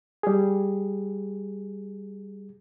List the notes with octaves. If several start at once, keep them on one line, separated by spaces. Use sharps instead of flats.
G3 G#4